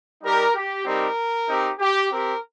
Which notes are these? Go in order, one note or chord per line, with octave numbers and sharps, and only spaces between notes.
G3 D#4 G4 A#4
G4
G3 C4 D#4 G4 A#4
C4 D#4 G4
G4
C4 G4 A#4